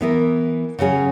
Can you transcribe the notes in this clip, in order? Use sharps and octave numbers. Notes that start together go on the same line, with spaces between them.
E3 B3 E4 A#4
C#3 F#3 C#4 G#4